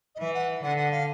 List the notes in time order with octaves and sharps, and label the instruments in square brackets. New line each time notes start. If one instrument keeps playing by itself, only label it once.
[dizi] D#5
[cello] E3 [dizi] E5
[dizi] F#5
[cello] D3 [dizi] F#5
[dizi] F#5
F5